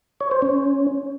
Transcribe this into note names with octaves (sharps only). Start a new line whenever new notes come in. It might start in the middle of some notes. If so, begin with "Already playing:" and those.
C#5
C5
C#4